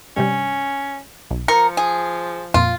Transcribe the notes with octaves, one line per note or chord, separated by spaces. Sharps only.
G2 C3 G3 C#4
B1
F3 A#4 C#7
G#4
F2 A#2 F4